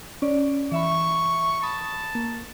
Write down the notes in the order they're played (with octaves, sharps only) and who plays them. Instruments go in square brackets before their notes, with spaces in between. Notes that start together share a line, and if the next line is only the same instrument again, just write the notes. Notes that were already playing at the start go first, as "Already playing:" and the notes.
[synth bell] C#4 D5
[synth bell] E3 E5 B5 [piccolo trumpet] C#6
[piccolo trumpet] A5 [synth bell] B5 D#6
[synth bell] A#3